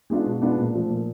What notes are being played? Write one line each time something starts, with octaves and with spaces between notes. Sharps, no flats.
G#3 B3 D4 F4
B2
G#3 B3 D4 F4
A#2
F3 A3
A#2